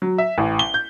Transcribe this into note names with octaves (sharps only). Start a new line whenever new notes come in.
F#3
E5
A1
G7
G6